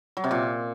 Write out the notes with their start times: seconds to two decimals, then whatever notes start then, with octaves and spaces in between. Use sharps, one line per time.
0.17 F#3
0.24 C3
0.31 A#2